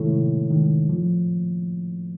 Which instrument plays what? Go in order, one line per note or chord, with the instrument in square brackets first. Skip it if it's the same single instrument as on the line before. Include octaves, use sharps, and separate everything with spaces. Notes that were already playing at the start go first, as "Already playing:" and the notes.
Already playing: [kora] A2 [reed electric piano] C3 D#3 G#3
[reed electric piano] C3
D#3 G#3
F3